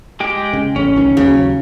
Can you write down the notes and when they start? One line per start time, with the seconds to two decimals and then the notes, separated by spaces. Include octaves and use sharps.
0.20 G#3 G4 G5
0.53 C#3
0.76 A1 C#4
0.96 C2 D#3
1.17 D#2 C#3 F#3